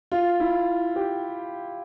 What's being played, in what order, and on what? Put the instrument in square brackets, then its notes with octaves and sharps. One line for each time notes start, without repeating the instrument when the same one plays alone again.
[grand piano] F4
E4
G4